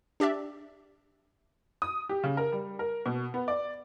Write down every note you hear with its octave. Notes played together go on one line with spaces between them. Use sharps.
D4 G4 D5 E5
D#6
G4
C#3
A#4
G3
A#4
B2
B3
D5